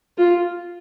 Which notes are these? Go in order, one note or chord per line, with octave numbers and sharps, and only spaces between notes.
F4